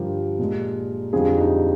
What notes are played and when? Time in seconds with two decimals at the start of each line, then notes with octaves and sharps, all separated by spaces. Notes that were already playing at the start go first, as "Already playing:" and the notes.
Already playing: G2 D3 F3 G4 A#4
0.39 A#2 G#3
1.13 F2 D3 G3 F4 G#4
1.37 D#4 G4